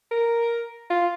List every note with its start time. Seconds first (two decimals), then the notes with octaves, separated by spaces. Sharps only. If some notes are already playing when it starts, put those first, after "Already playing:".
0.11 A#4
0.90 F4